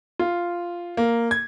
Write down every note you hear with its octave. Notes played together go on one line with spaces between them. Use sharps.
F4
A#3
G#6